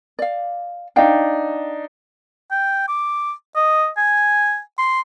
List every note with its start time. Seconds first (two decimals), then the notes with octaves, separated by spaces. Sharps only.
0.19 D5 F5
0.96 D4 D#4 F5 G5
2.51 G5
2.88 D6
3.56 D#5
3.97 G#5
4.78 C6